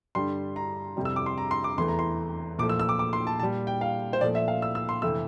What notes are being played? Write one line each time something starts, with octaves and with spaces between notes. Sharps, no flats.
G2 D3 G3 C6
A#5
F2 C3 G3
E6
D6
C6
A#5
C6
D6
E2 E3 A3 C6
A#5
C6
A#2 F3 A3 D6
E6
E6
D6
D6
C6
A5
A#2 G3 A5
G5
F5
C5
A#2 F3 A3 D5
E5
F5
E6
E6
C6
F2 C3 E3 A3 E6